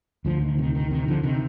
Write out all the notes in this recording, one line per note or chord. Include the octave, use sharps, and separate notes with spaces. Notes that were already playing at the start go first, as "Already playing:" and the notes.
D2 D3 F3
D#3
C3 D#3
D#3
C3 D#3
D3 F3
C3 D#3